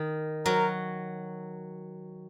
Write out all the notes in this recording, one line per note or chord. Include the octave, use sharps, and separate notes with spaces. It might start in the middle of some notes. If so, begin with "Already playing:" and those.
Already playing: D#3
F#3 A#4